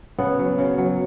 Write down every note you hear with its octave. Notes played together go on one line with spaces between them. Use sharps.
C#3 B3
F#3
C#3
F#3